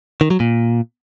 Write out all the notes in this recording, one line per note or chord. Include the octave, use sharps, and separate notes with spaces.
D#3
F#3
A#2